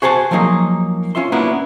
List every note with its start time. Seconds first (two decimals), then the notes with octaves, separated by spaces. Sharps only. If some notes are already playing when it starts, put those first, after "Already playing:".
0.02 F#4 G#4 C5 F#5 A5
0.31 F3 F#3 A#3 D#4 G#4
1.15 C#4 F4 E5 C6
1.32 A#3 B3 C#4 D4 E4 F#4